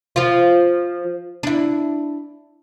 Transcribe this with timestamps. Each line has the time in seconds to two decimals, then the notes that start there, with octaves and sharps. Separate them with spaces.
0.16 F3 F4
1.43 D4 E4